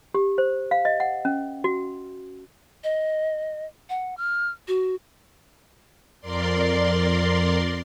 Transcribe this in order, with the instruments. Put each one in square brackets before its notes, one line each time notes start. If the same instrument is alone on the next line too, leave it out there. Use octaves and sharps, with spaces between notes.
[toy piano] G4
C5
F5
D#5
F#5
C#4
F#4
[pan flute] D#5
F#5
F6
F#4
[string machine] F2 A#4 D5 C6